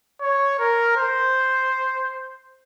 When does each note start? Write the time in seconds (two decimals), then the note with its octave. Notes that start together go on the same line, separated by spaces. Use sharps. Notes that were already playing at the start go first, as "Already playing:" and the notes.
0.21 C#5
0.59 A#4
0.97 C5